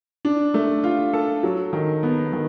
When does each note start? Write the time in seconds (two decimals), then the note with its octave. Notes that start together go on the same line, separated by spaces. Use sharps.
0.25 D4
0.54 A3
0.84 F4
1.13 A4
1.43 F#3
1.73 D#3
2.03 B3
2.33 D#3